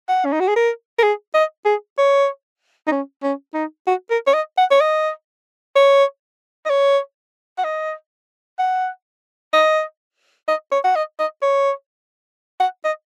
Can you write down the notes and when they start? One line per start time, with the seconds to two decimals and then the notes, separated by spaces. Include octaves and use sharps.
0.08 F#5
0.25 C#4
0.33 D#4
0.40 F#4
0.48 G#4
0.56 A#4
0.98 A#4
1.03 G#4
1.34 D#5
1.65 G#4
1.98 C#5
2.87 D#4
2.91 C#4
3.23 C#4
3.54 D#4
3.87 F#4
4.10 A#4
4.27 C#5
4.34 D#5
4.57 F#5
4.71 C#5
4.81 D#5
5.76 C#5
6.65 D#5
6.70 C#5
7.58 F#5
7.64 D#5
8.59 F#5
9.53 D#5
10.48 D#5
10.71 C#5
10.84 F#5
10.95 D#5
11.19 D#5
11.42 C#5
12.60 F#5
12.84 D#5